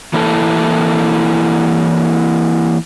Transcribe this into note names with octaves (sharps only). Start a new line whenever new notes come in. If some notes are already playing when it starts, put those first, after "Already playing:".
E3 A#3 E4 A4